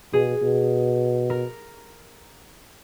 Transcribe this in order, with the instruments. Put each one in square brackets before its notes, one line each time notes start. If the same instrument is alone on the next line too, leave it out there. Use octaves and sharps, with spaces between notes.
[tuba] B2 [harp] G#4
[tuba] B2
[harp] A#4